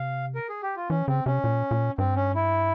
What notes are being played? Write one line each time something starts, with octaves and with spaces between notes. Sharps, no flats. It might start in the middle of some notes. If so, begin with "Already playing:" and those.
Already playing: C3 F5
A#4
G#4
G4
F4
E3 C#4
C#3 C4
C3 C#4
A#2
A#2
G2 C4
C#4
E4